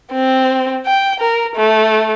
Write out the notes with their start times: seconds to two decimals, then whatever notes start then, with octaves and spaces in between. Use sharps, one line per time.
0.12 C4
0.86 G5
1.20 A#4
1.56 A3